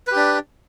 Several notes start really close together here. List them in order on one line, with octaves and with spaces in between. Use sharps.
B4 G4 D4